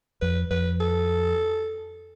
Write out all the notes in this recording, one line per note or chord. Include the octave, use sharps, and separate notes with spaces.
F2 B4
F2 B4
A4